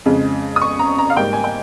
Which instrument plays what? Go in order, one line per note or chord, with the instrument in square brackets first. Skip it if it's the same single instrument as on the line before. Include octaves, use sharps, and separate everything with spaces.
[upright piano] F2 C#3 G#3
D#6
C#6
A#5
A#5
F5
G#2 G3 A#3 G5
G#5
G5